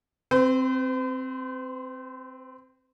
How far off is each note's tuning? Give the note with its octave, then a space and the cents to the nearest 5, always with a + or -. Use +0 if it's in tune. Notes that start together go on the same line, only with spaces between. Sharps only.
C4 +0 C5 -45